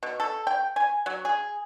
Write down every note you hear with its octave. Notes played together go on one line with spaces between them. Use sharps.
B2
A4
G5
G#5
F#3
G#4